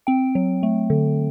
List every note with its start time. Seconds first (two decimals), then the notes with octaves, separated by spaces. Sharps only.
0.07 C4 G5
0.35 F#3
0.63 A3
0.90 D3